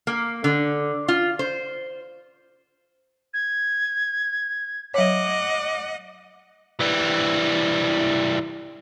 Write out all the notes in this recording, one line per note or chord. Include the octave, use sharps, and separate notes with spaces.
A#3
D3
F4
C5
G#6
F#3 C#5 D#5 F#5 D6
E3 G3